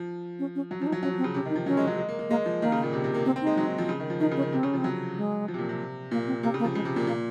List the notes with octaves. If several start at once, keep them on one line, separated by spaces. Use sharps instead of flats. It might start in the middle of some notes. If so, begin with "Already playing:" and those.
Already playing: F3
C#4
C#4
F#3
F3 C#4
D#4
F#3
F#3 C#4
F3
C4
C#3
C3 C#4
D#3
D#4
F3
F#3 C#4
G#3
F#3
G#3
A#3
A#3
G#3 A#3
F3
D#3 A#3
C#3
A#2
C3
C3
A#3
A#3 C4
C4
D#4
G#3
F#3
F3
C#3
D#3
F3
D#3 D#4
C#3
C#4
D#3
C3 C4
C#3 C#4
F3
C4
F#3
G#3
F3
C3
A#2
C3
A#2 A#3
C4
C3 A#3
C#3
A#3
F3
C#3 G#3
C3
A#2
A#2 A#3